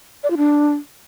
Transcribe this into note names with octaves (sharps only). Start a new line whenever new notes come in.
D5
F4
D4